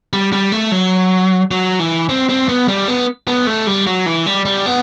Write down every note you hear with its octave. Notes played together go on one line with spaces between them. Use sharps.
G3
G3
A3
F#3
F#3
E3
C4
C4
B3
G3
B3
B3
A3
G3
F#3
E3
G3
G3
B3